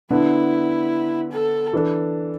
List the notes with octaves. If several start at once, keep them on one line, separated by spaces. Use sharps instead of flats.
D3 B3 D4 E4
A4
E3 D4 A4